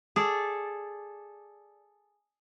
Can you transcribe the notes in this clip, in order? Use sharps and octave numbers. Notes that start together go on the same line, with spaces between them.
G#4 A4 D5